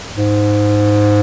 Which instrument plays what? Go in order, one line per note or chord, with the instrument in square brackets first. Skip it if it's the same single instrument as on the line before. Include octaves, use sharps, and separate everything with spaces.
[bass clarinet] G#2